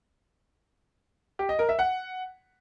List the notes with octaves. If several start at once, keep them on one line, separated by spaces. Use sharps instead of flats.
G4
D#5
A#4
E5
F#5